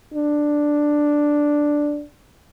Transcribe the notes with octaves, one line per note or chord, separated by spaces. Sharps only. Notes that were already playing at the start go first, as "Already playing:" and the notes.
D4